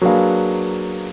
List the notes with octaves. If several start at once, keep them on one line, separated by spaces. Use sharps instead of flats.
F#3 A#3 D4 G#4 B4 F5